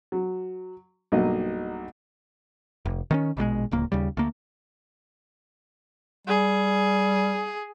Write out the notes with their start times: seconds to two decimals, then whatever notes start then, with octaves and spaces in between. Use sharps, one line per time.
0.12 F#3
1.12 B1 G2 F#3 A#3 D#5
2.85 F1
3.11 D#3 C4 C#4
3.37 A#1 B2 G3 G#3
3.71 D1 C#2 A#3
3.92 D#2 C#3 G3
4.17 D2 A#3
6.27 G3 G#4